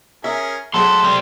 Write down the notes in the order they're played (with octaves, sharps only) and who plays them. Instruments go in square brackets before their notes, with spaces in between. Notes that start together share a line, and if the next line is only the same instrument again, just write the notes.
[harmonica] C#4 G#4 A#4 [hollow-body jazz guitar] E5
[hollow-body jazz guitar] F#3 G#3 A3 [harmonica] C4 E5 F#5 [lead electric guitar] A4 [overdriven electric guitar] C6
[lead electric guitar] G3 C4